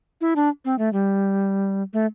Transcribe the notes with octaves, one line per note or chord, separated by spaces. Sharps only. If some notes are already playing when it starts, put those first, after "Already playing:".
E4
D4
C4
A3
G3
A3